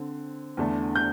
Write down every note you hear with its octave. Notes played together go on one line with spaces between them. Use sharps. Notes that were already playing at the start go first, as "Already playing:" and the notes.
Already playing: D3 C4
E2 D3 A3 D4
G6